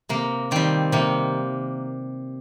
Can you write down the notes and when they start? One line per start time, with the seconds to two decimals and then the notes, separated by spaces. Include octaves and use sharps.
0.09 C3 A#3
0.51 D#3 G3 C4
0.92 C3 A#3